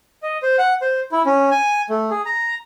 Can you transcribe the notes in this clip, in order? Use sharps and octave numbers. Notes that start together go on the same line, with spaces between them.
D#5
C5
F#5
C5
E4
C#4
G#5
A3
G#4
A#5